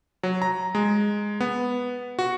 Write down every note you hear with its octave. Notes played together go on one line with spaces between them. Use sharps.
F#3
A#5
G#3
B3
F#4